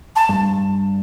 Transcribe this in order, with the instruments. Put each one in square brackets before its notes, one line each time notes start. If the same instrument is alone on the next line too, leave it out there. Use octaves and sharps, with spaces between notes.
[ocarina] A5
[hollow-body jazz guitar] G2